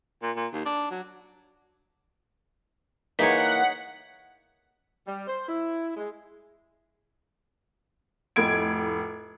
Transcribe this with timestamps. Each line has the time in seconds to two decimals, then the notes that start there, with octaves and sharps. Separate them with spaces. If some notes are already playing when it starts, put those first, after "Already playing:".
0.23 A#2
0.36 A#2
0.53 D#2
0.66 D4
0.91 F#3
3.19 E3 A#3 D#4 G#4 C#5 F#5 B6
5.07 G3
5.28 C5
5.49 E4
5.97 G#3
8.36 F1 A2 G#6 D7